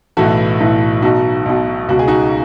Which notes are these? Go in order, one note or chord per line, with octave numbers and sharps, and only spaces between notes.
B1 A2 E3 F#4 A4
B1 A2 E3
B1 B2 D#4 F#4
B1 B2
C#2 B2 F#4
G#4
D#4 F#4